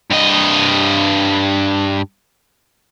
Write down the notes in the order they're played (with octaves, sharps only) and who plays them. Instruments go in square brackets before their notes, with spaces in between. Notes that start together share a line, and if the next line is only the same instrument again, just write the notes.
[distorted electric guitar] G2 D#5